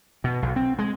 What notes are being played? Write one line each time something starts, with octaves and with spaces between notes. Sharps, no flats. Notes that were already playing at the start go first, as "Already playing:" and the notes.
B2
B1
C4
G#3